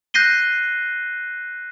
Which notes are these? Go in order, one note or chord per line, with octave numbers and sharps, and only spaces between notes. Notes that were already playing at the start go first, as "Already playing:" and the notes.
F#6 G6 A#6 C7 D#7 G7